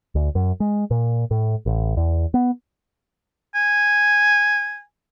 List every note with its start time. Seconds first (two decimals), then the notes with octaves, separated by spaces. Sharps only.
0.15 D2
0.35 F#2
0.60 G#3
0.91 A#2
1.31 A2
1.66 A1
1.97 E2
2.34 B3
3.55 G#5